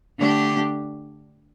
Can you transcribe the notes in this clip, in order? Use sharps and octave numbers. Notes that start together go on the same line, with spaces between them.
D3 A3 D4 G4